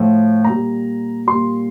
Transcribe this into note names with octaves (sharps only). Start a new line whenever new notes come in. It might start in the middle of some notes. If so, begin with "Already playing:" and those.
Already playing: A2 F3
A#2 G3 A#5
A#2 G3 C6